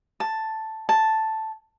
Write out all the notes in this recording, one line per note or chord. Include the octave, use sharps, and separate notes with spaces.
A5
A5